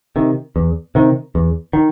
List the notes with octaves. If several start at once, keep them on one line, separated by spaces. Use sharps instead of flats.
C3 D#3
E2
C3 D#3
E2
D#3